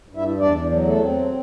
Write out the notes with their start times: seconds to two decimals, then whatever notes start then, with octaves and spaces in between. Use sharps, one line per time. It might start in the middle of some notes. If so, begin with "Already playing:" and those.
0.09 G2
0.16 E4 E5
0.39 E2 D4 D5
0.70 F#3
0.86 A3 A4
1.01 C4